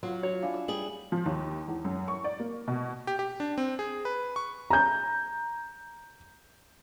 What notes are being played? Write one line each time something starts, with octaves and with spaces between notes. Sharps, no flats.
F#3 F4 F5 F#5
F#4 C#5
D4 E4 F5 G#5
E6
G3 G#4 F#7
F3
D#2
E2
F#2
C#6
D5
A#3
B2
G4
G4
D4
C4
G#4
B4
C#6
A#5 G6